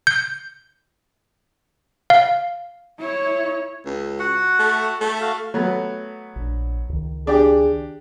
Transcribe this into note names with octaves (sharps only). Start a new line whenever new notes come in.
G6
F5
E4 C#5
C#2
F#4 F#5
A3
A3
F#4 F5
F#3 A3 B3
A#1 D4
C#2 D#3
D4 G4 G#4